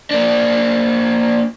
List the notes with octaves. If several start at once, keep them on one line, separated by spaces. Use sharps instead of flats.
A#3 D4